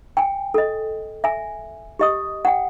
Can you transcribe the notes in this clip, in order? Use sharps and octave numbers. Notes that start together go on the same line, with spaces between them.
G5 G#5
A4 D#5
E5 G#5
G4 D#5 D#6
F#5 G5